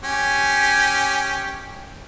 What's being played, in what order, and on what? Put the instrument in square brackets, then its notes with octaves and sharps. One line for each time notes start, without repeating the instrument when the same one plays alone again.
[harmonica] C#4 G4 G#5